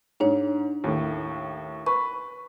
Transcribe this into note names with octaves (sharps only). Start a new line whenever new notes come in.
G#2 D4 D#4 C#5
D#2 A2
B4 C#6